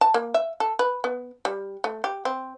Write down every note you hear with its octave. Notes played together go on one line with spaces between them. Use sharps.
A5
A#3
E5
A4
B4
B3
G3
A3
G4
C4